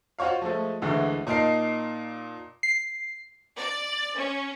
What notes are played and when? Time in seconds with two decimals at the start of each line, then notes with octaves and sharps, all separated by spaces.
0.19 F4 F#4 C5 C#5 F5
0.42 F3 G#3 A3
0.82 D2 D3 E3 G#3 A3
1.27 A#2 D#4 A#4 A5 C7
2.63 C7
3.57 D5
4.18 C#4